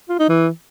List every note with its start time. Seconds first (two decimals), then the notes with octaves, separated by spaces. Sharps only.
0.09 F4
0.19 D#4
0.29 E3